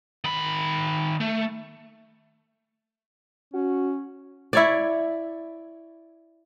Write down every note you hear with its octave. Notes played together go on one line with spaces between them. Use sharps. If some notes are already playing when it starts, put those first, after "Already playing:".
D#3 B5
A3
C#4 F#4
E4 C#5 D5